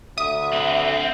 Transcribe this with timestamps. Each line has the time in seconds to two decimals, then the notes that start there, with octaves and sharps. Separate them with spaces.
0.18 D2 E5 D#6
0.54 C4 B4